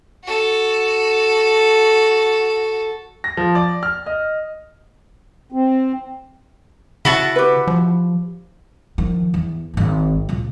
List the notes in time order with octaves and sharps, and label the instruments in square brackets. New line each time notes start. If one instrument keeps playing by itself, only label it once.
[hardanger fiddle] F#4 A4
[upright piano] A#6
F3
D5
F6
D#5
[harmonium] C4
[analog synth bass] C#3 [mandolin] E4 F#4 A5
[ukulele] G4 B4
[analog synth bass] F3
[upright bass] D#3 F3
E2
G#1 G#2
C#2 A#2